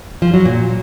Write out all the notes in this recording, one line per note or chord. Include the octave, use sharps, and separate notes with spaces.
F3
F#3
A#2